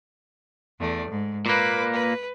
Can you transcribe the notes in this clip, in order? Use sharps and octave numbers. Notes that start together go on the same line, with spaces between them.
E2 A3 D5
G#2
A#2 A#3 B4 B5 D6
B4